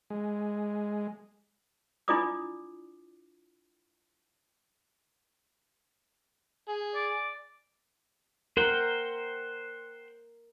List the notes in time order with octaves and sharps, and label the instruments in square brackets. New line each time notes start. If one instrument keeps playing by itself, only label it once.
[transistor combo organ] G#3
[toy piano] D4 E4 F4 D5 D6 D#6
[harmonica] G#4
[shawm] D5
[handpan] A#4 [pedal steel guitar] C5 F#5 G5